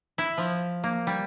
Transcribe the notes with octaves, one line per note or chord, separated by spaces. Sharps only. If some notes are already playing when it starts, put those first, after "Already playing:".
E4
F3
A#3
G3